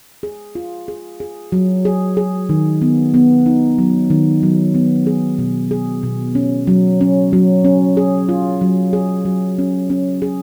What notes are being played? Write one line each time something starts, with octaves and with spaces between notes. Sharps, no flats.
G#4
F4
G#4
G#4
F#3
G#4
G#4
D#3
B3
B3
D#4
F#3
D#3
F#3
B3
G#4
B2
G#4
B2
C#4
F#3
C#4
F#3
C#4
G#4
F4
F#3
G#4
F#3
C#4
C#4
G#4